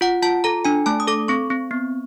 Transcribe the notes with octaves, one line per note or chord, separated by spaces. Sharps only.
F4 F#5
F4 A5
A4 A#5
D4 G#5
A3 A5
D#6
A4 D6
C4 C#6
C4
B3